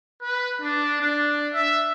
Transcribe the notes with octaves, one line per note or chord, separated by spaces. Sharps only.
B4
D4
D4
E5